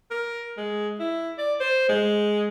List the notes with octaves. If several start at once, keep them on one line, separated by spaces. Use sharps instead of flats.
A#4
G#3
E4
D5
C5
G#3